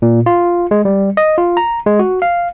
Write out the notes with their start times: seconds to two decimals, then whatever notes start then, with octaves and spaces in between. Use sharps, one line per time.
0.02 A#2
0.26 F4
0.71 G#3
0.85 G3
1.17 D#5
1.38 F4
1.57 A#5
1.86 G#3
1.99 F#4
2.22 F5